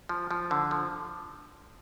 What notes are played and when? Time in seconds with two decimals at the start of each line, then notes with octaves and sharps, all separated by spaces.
0.09 F3
0.31 F3
0.51 D3
0.71 F3